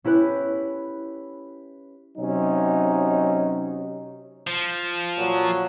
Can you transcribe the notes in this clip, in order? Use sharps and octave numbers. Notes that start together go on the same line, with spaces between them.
C#4 E4 G4 B4
C3 F#3 C#4 D#4
F3
A#2 F#3